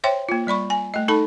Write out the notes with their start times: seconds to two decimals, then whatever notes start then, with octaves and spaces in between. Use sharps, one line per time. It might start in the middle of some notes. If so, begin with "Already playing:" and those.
0.04 C5 C#5 E5 G5 C6
0.29 A#3 F4
0.47 G3 D5 B5 C#6
0.70 G#5
0.94 A3 D#5
1.08 D#4 A4 A5 B5